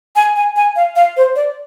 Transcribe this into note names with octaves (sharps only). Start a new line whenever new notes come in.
G#5
G#5
G#5
F5
F5
C5
D5